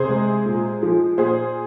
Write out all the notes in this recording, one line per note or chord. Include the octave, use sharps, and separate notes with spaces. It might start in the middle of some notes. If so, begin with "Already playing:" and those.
Already playing: C3 G#4 C5
G#3
A#2
F3
A#2 G#4 C5